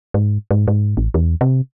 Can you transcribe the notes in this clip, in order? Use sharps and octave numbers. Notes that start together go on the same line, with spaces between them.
G#2
G#2
G#2
A1
E2
C3